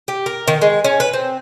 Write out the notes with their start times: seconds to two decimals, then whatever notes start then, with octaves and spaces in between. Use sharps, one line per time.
0.08 G4
0.26 A#4
0.48 D#3
0.62 G#3
0.85 C#4
1.00 B4
1.13 C4